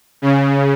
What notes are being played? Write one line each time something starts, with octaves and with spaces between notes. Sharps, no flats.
C#3